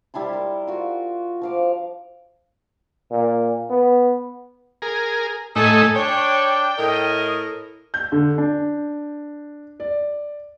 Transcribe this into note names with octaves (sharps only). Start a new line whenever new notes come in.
G3 E4 A5 C6
A#4
F4 F#4
F3 F5 D6
A#2
B3
G#4 A#4
A2 A3 D#4 A4 G#5
D4 C#5 G5
A2 A#4 D#5
G6
D3
D4
D5